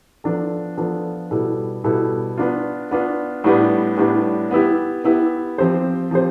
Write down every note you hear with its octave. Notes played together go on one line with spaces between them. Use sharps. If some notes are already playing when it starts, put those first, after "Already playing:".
F3 B3 D4 F4 A4
F3 B3 D4 F4 A4
B2 G3 B3 E4 A4
B2 G3 B3 E4 A4
B3 D4 F4
B3 D4 F4
A2 G3 B3 D4
A2 G3 B3 D4
B3 E4 G4
B3 E4 G4
F3 C4 G4 C5
F3 C4 G4 C5